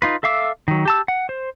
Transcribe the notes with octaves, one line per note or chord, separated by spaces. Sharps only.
D#4 F4 B4
A4 E5 F5 D6 E6
D#3 F#3
G4 A5 E6
F#5
C5